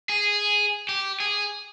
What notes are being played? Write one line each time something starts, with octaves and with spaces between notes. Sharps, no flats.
G#4
G4
G#4